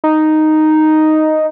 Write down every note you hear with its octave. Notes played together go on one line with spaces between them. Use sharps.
D#4